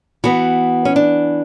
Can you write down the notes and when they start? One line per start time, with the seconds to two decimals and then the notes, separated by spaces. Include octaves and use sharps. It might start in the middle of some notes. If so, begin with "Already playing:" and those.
0.24 E3 B3 F#4
0.85 C#4
0.96 D4